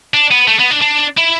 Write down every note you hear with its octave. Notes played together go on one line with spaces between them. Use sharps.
D4
B3
A3
B3
D4
D4
E4